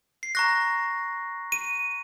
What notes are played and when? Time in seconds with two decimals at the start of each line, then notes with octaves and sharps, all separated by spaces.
0.23 C7
0.35 A#5 C#6 F#6 A#6
1.52 D#7